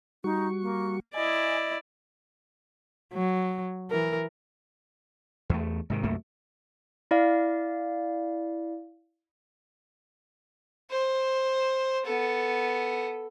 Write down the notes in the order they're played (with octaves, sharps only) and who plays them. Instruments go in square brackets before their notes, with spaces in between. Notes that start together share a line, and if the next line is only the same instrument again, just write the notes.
[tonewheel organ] G3 F#4 C#6 [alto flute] D#4
[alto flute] A#3
[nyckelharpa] E4 D5 [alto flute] D#5 [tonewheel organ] G#5
[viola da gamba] F#3
E3 A#4
[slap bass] E2 A3
G#2 C3 D#3
C2 F#2 A3 A#3
[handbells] E4 D5 F5
[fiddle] C5
B3 A4